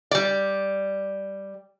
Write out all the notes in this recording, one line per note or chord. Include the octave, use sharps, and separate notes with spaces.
G3 D5